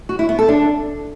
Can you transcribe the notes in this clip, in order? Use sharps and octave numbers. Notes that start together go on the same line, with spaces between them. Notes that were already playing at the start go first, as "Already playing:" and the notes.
F#4
E4
B3
A4
D4